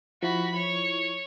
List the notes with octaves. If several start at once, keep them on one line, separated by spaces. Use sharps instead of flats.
F3 E4 F#4 B5
C#5